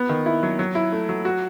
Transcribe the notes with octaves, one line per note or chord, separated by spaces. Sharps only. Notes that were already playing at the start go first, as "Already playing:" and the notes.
Already playing: B3
D#3
E4
F#3
F#3
E4
A3
F#3
F#4